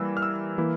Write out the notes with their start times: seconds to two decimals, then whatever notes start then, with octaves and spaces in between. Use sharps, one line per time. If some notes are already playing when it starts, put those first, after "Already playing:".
Already playing: E3 G3 A#3 E6
0.17 F6
0.23 E6
0.58 E3 A#3 E4